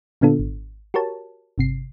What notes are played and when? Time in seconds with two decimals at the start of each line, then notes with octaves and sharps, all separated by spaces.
0.21 A#2 D3 B3 D4 F4 A4
0.39 G#1
0.94 F#4 G4 A#4 C#5 A5
1.58 G1 C3 C7